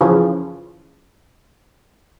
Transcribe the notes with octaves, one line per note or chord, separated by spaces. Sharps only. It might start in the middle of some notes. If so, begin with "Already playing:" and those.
F#2 C#3 E3 F3